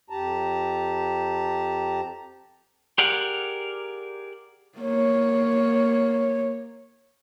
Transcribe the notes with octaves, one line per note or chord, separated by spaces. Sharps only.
F2 G4 A5 A#5
G4 G#4 A#4 D5 F#5
A#3 C#5